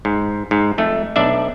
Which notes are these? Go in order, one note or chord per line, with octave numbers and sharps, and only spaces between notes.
G#2
G#2
F2 A3
B1 D4 D5 E5